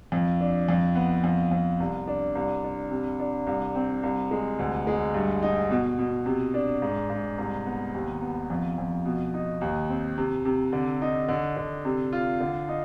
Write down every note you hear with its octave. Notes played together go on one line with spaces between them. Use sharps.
F2
D4
F2
B3
F2
F2
C2
D4
C2
D4
C3
D4
C2
C4
C2
G#3
D2
G#3
G2
D#4
B2
B2
C3
D4
G#2
G#2
C2
B3
D#2
B3
F2
F2
B2
D#4
D#2
C4
C3
C3
D3
D#4
D3
D3
C3
F4
D3
D#4